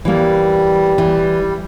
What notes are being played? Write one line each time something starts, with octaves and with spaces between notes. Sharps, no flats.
E3 G3 A#3
E3